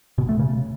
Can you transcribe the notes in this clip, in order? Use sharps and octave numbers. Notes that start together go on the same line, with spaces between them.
B2
A3
C#3